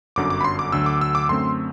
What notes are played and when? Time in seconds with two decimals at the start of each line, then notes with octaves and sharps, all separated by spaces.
0.16 G1 F#2 D3 F#3 D6
0.30 D6
0.41 B5
0.44 C6
0.59 D6
0.72 D2 D3 F#3 E6
0.86 D6
1.01 E6
1.15 D6
1.29 F#2 D3 A3 C4 C6